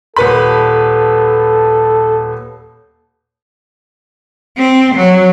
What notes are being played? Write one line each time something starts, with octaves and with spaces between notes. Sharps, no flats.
D#1 A4 B4 B5
C4
F#3